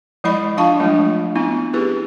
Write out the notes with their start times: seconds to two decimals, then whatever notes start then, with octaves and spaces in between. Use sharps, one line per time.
0.24 F3 G#3 E4 D5 D#5 B5
0.57 F3 D4 F4 F5 A5 C#6
0.80 F3 F#3 G#3 A3 D4 F4
1.35 B3 C4 D#4 E4
1.73 E4 G4 G#4 B4